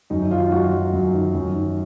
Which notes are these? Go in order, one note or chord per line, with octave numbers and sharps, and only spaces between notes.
F#2 D#4
D#4
D#3 F4
F#2 F#4
F#3
F#2
D#3
F#2
D#3